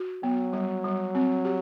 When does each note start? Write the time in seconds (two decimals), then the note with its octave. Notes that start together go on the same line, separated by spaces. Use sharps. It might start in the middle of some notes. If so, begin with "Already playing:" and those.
Already playing: F#4
0.23 F#3 B3
0.53 G3
0.84 G3
1.15 C4
1.45 G4